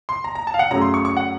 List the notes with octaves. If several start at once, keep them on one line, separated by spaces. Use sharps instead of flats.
C6
A#5
A#5
A5
F5
F#5
F#2 C#3 F#3 A3 A#5
C6
C#6
C#6
F#5